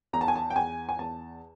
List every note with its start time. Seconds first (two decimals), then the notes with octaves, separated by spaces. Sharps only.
0.13 E2 A#5
0.21 A5
0.28 G#5
0.36 A5
0.50 G5
0.56 E2 G#5
0.89 G#5
0.99 E2 A5